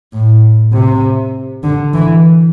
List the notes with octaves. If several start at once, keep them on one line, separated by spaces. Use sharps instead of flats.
A2
C3
D3
E3